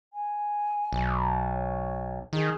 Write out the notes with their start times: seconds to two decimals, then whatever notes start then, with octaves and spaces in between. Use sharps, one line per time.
0.13 G#5
0.93 B1
1.52 C#5
2.33 D#3 G#4